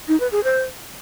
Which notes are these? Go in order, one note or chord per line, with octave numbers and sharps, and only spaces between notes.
D#4
B4
G#4
C5